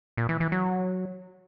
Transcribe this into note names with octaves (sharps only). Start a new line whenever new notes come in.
A#2
E3
E3
F#3